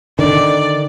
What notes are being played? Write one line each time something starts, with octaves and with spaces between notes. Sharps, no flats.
D3 D#3 D5